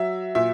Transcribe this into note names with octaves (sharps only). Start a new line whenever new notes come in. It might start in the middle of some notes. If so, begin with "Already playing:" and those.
Already playing: F#3 E5
A#2 E5